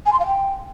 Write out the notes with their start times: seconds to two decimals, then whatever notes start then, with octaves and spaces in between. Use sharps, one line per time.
0.06 G#5
0.13 C6
0.20 F5
0.26 G5